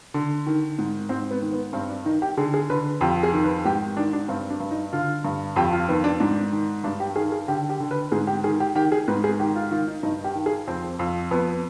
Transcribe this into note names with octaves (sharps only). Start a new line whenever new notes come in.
D3
D#3
G#2
G#2 C4
B3
D#3
B3
G2 C4
D4
D#3 D#4
G4
D3 G#4
G#4
D3 B4
F2 G4
G#4
D#3
B4
G#2 G4
D#3 D4
D4
G2 C4
D4
G2
D#4
D3 F4
G2
F2 G4
F4
D#3 B3
D4
G#2 D4
D#3
G2 D4
G4
D#3 G#4
G#4
D3 G4
G4
D3
B4
G#2 G#4
G4
D#3 G#4
G4
D#3 G4
G#4
G#2 B4
G#4
D#3 G4
F4
D#3 F4
D#4
G2 D#4
G4
D#3
G#4
F2 C4
F2
F2 B3